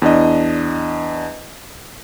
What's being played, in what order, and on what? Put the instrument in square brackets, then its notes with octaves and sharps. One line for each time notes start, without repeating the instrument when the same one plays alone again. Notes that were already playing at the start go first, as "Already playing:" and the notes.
[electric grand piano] E2 D4 D#5